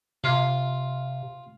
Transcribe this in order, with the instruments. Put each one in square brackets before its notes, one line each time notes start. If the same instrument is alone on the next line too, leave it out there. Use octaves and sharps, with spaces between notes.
[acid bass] C3 [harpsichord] F4 F5